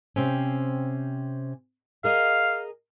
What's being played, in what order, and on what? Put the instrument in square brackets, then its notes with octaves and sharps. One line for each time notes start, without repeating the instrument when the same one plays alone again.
[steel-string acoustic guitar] C3 C4 C#4
[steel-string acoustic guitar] G#4 A#4 D#5 [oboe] F5